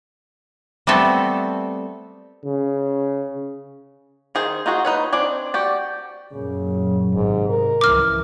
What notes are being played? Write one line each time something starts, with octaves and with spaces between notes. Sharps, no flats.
G3 A3 B3 C4 A4 E5
C#3
D#3 G#4 C5
D#4 F4 F#4 G#4
D#4 B4 C#5
C4 D4 D5 G#5
F#4 G4 D5
F#2 A#2 C#3 F#3
G#1 G#2 C3
A#4
C#2 E3 F3 D6 F6